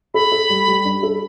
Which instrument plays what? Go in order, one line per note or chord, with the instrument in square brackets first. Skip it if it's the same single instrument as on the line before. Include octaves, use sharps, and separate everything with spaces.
[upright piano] A4 [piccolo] B5
[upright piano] A4
G3
G3
D4
A4